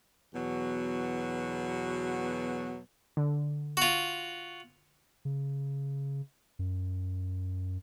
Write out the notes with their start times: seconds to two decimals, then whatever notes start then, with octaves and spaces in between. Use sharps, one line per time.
0.33 E2 B2 F#3
3.17 D3
3.77 F4 F#4
5.25 C#3
6.59 F#2